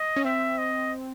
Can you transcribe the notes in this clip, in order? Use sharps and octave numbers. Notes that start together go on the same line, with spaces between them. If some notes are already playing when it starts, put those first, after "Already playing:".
Already playing: D#5
C#4
C4 E5
D#5